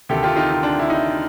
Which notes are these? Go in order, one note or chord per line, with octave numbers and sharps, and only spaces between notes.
D2 C3 D#3 G4 A4
F4 G4
D#4 F4
D#4
D4
E4
D#4